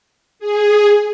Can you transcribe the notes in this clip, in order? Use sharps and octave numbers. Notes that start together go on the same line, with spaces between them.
G#4